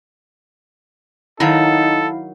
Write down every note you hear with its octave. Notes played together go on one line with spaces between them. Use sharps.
D#3 F#3 D#4 E4 A4 F5